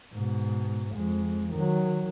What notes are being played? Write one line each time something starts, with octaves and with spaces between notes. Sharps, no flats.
G#2 B2
F2 G#3
D#3 F#3